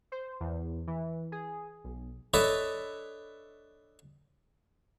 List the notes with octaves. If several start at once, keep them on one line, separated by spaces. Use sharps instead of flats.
C5
E2
E3
G#4
B1
D4 A4 B4 C#5 D#5 E5